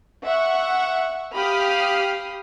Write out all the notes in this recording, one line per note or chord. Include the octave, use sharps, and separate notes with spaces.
E5 F#5 C#6
G4 F5 B5 D#6 F6